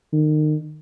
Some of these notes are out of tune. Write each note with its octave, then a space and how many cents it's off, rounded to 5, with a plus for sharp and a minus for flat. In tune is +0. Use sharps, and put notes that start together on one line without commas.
D#3 -30